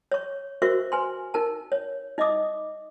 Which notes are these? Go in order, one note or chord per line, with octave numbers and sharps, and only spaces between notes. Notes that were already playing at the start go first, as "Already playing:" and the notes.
C#5 C#6
F#4 A#4 C5 E5 C#6
B4 G#5 C6
D#4 A#4 A5
C#5
D#4 D#5 E5 D6 D#6